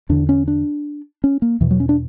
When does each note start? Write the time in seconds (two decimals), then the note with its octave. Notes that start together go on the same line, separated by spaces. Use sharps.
0.09 E2 D3 D4
0.29 C#4
0.48 D4
1.24 C#4
1.42 A#3
1.61 E2 B2 E3
1.71 F#3
1.80 C#4
1.89 D4